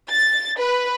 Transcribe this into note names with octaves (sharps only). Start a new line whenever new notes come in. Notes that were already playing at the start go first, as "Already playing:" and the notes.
A6
B4